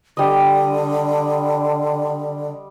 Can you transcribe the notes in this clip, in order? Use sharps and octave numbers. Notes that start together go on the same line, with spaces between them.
D3 G3 D#5